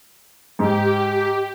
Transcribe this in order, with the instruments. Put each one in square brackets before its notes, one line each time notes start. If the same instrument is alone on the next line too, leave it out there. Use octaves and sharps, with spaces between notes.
[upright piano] G#2 [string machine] G4